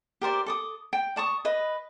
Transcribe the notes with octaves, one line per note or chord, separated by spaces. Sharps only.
G4 A#4 C5 D5
A4 D6 D#6
G5
D5 A5 C#6 D#6
B4 D#5